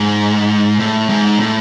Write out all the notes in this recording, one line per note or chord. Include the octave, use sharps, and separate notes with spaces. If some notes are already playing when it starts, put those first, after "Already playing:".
Already playing: G#2
A2
G#2
A2